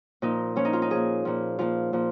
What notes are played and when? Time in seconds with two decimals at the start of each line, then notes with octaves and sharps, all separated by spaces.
0.22 A#2 F3 D#4
0.56 A#2 F3 C#4
0.65 D#4
0.73 F4
0.82 D#4
0.90 A#2 F3 G#4
1.25 A#2 F3
1.59 A#2 F3 F4
1.93 A#2 F3